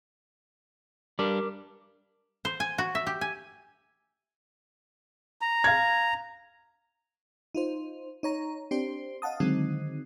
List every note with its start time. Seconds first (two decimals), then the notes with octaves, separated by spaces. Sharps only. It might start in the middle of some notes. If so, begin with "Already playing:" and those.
1.19 G3 D4 A#4 D6
2.45 C5
2.60 G#5
2.78 F#4
2.95 E5
3.07 G4
3.21 G#5
5.41 A#5
5.64 F5 G#6
7.55 D#4 F4 C5
8.23 D#4 C#5 A#5
8.71 C4 D4 G4 C5
9.22 D#5 F5 F#5 A5 D#6
9.40 D3 D#3 F#3 G#3 C4 D#4